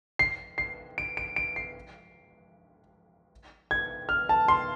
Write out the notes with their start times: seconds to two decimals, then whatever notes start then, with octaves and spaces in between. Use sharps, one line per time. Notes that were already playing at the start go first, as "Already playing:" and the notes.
0.19 C7
0.58 C7
0.98 D7
1.17 D7
1.36 D7
1.56 C7
3.71 G#6
4.09 F6
4.29 A5
4.48 C6